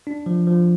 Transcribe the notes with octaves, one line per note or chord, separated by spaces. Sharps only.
D4
F3
F3